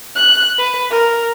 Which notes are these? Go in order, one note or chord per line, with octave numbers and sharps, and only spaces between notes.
F#6
B4
A#4